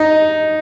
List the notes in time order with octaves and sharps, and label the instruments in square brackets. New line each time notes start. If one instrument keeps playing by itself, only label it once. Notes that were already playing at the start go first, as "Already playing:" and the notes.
Already playing: [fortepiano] D#4